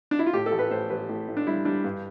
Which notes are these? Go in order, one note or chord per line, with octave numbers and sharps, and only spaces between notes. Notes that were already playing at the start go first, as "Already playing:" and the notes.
D4
E4
F4
A2 G4
A4
A1
B4
A2 C5
A1 B4
A2
A2
D4
G3 E4
G3 D4
G2